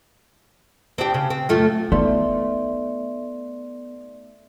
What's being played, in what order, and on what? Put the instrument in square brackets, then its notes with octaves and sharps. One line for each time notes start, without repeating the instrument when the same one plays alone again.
[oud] C4 D4 G4
C#3
C4
F#2 A3 F4
[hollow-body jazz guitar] A3 [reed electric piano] B3 [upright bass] D#4 [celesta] D5 C6